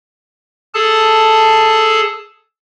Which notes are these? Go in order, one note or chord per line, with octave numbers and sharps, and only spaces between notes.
G#4 A4 A5